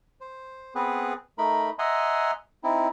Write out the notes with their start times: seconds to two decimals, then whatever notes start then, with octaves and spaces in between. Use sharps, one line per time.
0.21 C5
0.75 B3 C4 G#4 B4
1.38 A3 D#4 A#4 B5
1.79 D#5 E5 F#5 G#5 A#5 C6
2.64 C4 D#4 E4